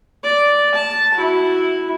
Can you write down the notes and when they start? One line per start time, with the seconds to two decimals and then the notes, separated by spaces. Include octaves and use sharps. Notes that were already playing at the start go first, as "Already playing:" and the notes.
0.23 D5
0.75 A5
1.14 E4 F#4